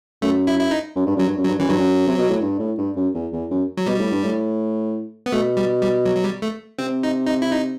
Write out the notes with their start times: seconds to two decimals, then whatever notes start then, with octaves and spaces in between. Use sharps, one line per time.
0.22 F#2 A3
0.47 E4
0.60 E4
0.71 D#4
0.96 F#2
1.06 G2
1.16 F#2 F#3
1.27 G2
1.37 F#2
1.44 F#3
1.48 G2
1.58 F#2 E3
1.68 G2 F#3
1.79 F#2
2.07 C3
2.18 B2
2.30 A2
2.42 G2
2.59 A2
2.78 G2
2.96 F#2
3.14 E2
3.32 E2
3.51 F#2
3.77 F#3
3.87 B2 G3
3.99 A2
4.12 G2
4.24 A2
5.26 B3
5.33 B2 A3
5.57 G3
5.81 G3
6.05 F#3
6.16 F#3
6.24 G3
6.42 A3
6.79 C3 C4
7.03 D#4
7.27 D#4
7.42 E4
7.51 D#4